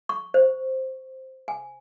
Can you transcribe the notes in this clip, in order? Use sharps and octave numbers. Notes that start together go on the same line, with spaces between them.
C#6
C5
G#5